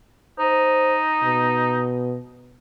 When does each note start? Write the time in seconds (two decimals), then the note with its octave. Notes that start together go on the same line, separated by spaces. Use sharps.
0.39 D#4 C5
1.24 B2